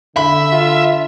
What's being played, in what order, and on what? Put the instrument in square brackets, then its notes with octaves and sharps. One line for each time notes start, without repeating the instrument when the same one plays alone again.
[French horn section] D3 [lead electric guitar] E5 [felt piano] B5
[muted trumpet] F4